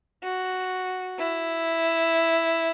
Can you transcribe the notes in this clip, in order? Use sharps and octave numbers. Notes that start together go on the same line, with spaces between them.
F#4
E4